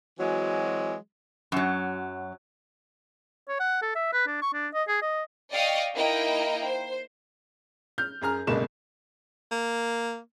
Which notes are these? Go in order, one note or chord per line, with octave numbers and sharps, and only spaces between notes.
E3 F#3 G#3 C4 F#4
F#2 F#3
C#5
F#5
A4
E5
B4
D4
C#6
D4
D#5
G#4
D#5
D5 D#5 F5 G5 C#6 D#6
A#3 D#4 E4 D#5 G5
C5
F6 G6
F#2 G#4 A#5 F6
G1 C#2 B2 G#3 A#3 E7
A#3